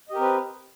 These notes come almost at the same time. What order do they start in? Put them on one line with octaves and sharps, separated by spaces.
D#5 G4 A#4 C4 B4